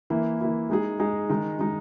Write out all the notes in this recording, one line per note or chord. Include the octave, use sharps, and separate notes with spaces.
E3 A#3 E4
E3 A#3 E4
G#3 D#4 G#4
G#3 D#4 G#4
D#3 G#3 D#4
D#3 G#3 D#4